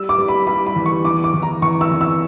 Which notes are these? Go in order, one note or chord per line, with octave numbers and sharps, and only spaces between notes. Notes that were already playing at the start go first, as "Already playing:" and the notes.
Already playing: G3 E6
D6
G3
B5
G3 B5
B5
E2
C#6
E2 D6
D6
E2
A#5
E2 C#6
E6
E2
E6